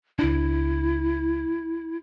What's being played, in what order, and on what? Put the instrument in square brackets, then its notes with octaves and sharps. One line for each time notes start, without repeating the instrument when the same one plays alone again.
[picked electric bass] C#2 D4 [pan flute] E4